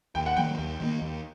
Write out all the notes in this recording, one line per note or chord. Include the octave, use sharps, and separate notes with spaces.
D#2 G5
F#5
D#3 F#3 A#3 G5
D#2
D#3 F#3 A#3
D#2